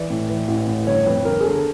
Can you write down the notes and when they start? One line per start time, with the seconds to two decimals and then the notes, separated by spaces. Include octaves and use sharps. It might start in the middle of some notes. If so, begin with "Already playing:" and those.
Already playing: E3 D5
0.10 A2
0.29 E3
0.48 A1
0.67 A2
0.87 G1 C#5
1.06 F2 B4
1.25 G1 A#4
1.41 G#4
1.44 D3 A4